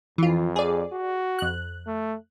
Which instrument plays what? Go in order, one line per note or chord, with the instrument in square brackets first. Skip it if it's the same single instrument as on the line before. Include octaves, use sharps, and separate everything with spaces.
[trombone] F2 [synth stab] E3 F4
[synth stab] G#4 D5
[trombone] F#4
[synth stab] F2 F#6
[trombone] A3